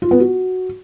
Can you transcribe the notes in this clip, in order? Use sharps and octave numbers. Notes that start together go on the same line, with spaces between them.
F4
B3
F#4